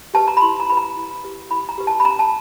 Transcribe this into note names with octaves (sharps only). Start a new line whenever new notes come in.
G4 B4 A5
A#5
B5
E4 C6
A#5
G4 B4 B5
A#5
E4
G4 B4
E4 B5
A#5
G4 B4
A5
B5
C#4 A#5
A5